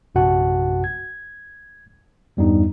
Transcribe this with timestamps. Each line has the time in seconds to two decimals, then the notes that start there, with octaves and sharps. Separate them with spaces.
0.15 A#1 F#2 C3 F#4 F#5 A5
0.84 G#6
2.37 E2 G2 G3 B3 D4 D#4